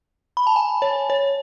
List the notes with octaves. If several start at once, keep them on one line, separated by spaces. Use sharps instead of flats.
B5
A5
G#5
C#5
C#5